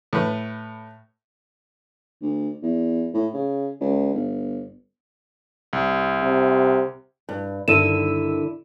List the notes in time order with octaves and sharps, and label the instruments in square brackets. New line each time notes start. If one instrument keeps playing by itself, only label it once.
[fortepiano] A2 B4
[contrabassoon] D2
E2
A2
C#3
C#2
G1
[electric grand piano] C2
[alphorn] C3
[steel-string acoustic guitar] G2
[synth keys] G2 D#3 E6 [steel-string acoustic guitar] D3 E4 [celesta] D#7 E7